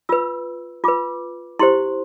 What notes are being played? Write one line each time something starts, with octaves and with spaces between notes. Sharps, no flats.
F4 B4 E6
F4 B4 D6
E4 G4 C5 C6